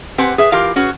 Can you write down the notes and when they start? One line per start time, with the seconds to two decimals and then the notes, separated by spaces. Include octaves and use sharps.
0.18 C4 G4 B4 C5 F#5 G#5
0.38 G#4 B4 E5
0.52 E3 F4 G4 A#4 F5
0.76 C#4 F#4 G#4 B4